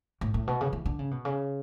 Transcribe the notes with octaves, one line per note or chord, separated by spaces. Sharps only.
A2
A2
B2
C#3
E3
D3
C#3
B2
C#3